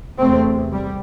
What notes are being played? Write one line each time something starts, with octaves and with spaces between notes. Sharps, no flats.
E2 C3 A3 C4
G3